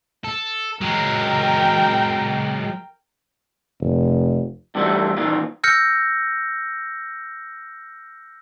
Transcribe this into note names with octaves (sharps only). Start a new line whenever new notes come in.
A4
F#3 G#3 A#4 G5
F1
G2 C3 E3 F3 G3 A3
A#2 D#3 E3 F4
E6 F6 G6 A#6 C#7